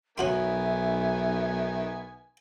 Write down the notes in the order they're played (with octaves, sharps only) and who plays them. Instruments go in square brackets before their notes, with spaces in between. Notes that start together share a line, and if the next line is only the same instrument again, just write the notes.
[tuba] B1 [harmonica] D#3 B3 G#5 [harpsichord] C#4 F#4 C6 [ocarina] E5